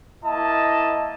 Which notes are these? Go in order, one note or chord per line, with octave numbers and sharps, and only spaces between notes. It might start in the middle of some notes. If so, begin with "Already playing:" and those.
A#3 E4 D#5 A5